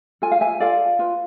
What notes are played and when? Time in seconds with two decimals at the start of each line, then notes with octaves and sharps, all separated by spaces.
0.22 F4 A4 G#5
0.32 F5
0.41 E5 G#5
0.60 F4 A4 D5 F5
0.99 F4 B4